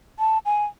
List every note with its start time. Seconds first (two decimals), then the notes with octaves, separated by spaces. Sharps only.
0.19 A5
0.46 G#5